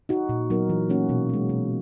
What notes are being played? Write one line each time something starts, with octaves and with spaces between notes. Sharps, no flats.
D#4 F#4
A#2
F#3 B3 D#4 A#4
E3
A#3 C#4 F#4
B2
G#3 C#4
B2